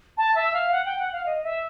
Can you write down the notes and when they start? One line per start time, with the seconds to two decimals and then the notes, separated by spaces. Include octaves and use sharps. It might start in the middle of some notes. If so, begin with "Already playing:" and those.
0.18 A5
0.36 E5
0.54 F5
0.72 F#5
0.85 G5
0.99 F#5
1.13 F5
1.26 D#5
1.44 E5